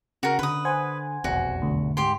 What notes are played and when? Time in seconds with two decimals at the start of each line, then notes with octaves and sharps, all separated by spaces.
0.23 C#3 F#4 A#4
0.39 D3 B4 D#6
0.65 C5 F#5 G#5
1.24 F1 B1 E2 F#4
1.62 D2
1.97 G#2 G4 C6